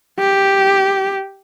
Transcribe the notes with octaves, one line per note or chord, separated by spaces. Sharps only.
G4